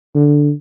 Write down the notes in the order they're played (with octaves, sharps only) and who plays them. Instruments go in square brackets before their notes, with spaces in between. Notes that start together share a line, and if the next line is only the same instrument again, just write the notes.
[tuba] D3